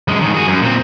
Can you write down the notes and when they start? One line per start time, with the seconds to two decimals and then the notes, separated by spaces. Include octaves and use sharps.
0.08 F#2 G#3
0.21 G#2 D#3
0.34 F#4 G#4
0.48 F#2
0.62 A#2 C4